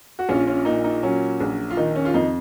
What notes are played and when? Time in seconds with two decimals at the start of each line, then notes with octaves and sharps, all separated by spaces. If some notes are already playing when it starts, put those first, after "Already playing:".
0.19 F#4
0.29 A#1 C#4 F4
0.47 C#4 F4
0.65 A#2 D#4
0.84 D#4
1.03 F#3 C#4
1.40 A#1
1.70 F4
1.77 D#3 D#4
1.95 C#4
2.05 F4
2.14 F2 D#4